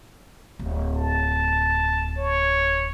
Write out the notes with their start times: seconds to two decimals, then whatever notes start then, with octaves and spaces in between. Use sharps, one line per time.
0.59 D1
0.97 A5
2.17 C#5